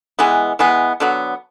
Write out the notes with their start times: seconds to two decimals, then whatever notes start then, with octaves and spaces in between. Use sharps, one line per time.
0.19 E3 G#3 B3
0.59 E3 G#3 B3
1.00 D3 F#3 B3